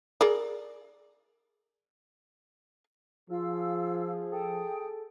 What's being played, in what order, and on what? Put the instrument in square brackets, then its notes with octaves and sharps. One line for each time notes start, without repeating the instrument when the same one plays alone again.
[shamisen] G#4 A#4 D5
[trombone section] F3 [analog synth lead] F4 [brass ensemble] G#4 [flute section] F5 E6
[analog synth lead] A4 [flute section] G5 D#6